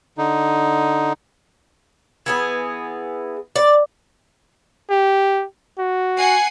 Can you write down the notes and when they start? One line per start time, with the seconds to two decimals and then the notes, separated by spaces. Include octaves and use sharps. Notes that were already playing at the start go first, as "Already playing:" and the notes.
0.18 D3 D#4
2.26 E3 B3 G#4
3.56 D5
4.90 G4
5.78 F#4
6.17 F#5 G#5 C7